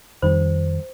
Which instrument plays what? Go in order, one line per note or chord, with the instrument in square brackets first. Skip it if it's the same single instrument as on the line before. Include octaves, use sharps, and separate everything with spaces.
[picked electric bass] F2 D#3 G3 [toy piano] C5